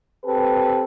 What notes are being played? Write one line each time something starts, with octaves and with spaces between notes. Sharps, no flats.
C4 G4 A4 B4